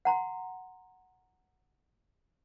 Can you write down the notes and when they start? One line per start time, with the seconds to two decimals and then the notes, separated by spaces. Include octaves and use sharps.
0.05 F#5 A#5 C6